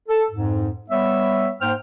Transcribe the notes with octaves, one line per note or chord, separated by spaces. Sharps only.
A4
F2 G#2
G3 B3 C#5 E5
G#2 A#3 C5 G5 F6